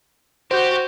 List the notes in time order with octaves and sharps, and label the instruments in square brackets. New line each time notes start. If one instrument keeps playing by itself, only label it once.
[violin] F#4 [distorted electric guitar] G4 [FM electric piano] C5 G6